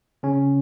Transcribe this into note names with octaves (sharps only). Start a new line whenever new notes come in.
C#3 C#4